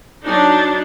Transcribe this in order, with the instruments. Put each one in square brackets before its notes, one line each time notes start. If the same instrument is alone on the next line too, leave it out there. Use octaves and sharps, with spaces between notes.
[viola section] F#3 D4 D#4